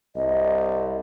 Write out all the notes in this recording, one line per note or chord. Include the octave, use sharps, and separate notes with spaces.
C2 D#5